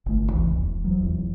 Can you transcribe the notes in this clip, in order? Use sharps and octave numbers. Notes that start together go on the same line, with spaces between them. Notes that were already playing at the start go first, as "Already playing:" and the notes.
G1 A3
C#2 E3
E1
E3 F#3
F1 E2